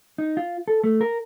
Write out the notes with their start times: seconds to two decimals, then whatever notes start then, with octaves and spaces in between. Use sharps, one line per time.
0.18 D#4
0.37 F4
0.68 A4
0.84 A3
1.01 A#4